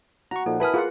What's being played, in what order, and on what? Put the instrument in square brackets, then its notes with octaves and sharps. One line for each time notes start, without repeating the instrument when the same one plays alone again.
[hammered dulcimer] F#4 [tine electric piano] A#5 C#6
[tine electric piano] A#2 F3 D#4 [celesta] A4
[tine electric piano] E4 B5 D#6 [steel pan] A#4 B4 G#5 [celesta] A5 F6
[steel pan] F4 A#4 F#5 [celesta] G#4